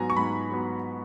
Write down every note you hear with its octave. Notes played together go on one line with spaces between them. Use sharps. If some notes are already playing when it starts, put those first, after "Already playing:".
Already playing: G#2 F#3 B3 G#5 A#5
C#6
G#2 B5
F#3 B3